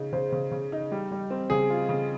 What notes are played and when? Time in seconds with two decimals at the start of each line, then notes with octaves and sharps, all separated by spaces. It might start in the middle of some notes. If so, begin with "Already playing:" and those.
Already playing: C#3 D#4
0.13 C#3 C5
0.32 C#3
0.51 C#3
0.72 D#4
0.92 G3
1.12 G3
1.30 C4
1.50 C#3 G#4
1.70 F4
1.89 C#3